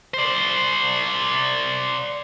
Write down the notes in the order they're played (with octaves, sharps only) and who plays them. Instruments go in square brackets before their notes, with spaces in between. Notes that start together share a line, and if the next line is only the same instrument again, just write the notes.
[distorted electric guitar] C5 D5